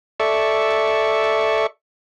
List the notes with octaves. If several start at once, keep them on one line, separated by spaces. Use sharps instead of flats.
A4 D5 E5 C#6